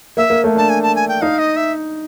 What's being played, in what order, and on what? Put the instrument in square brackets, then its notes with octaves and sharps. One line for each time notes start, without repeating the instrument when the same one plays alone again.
[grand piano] A#3 [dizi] E5
[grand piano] A#3
A3
[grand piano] D4 [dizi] A5
[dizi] G#5
A5
G#5
G5
[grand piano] D#4 [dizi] F5
[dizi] D#5
E5